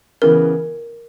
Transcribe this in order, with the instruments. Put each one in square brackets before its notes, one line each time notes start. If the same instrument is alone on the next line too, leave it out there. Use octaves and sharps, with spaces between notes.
[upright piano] C#3 E3 B3 [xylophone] A#4